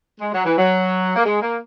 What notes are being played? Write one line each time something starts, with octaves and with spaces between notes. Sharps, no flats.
G#3
F#3
E3
F#3
A#3
G#3
A#3